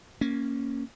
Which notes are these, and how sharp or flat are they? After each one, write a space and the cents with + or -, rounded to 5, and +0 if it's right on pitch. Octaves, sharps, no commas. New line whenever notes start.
A#3 +0 C#4 +0